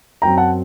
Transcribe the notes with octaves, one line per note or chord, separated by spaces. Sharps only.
F#2 F#3 C4 G5 A#5
F#5 A5